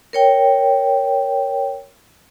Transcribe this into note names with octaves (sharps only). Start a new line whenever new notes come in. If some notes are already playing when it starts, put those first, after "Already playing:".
A#4 C#5 G5